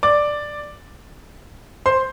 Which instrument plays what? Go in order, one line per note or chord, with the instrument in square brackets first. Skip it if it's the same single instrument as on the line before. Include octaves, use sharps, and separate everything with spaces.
[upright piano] D5 D6
C5 C6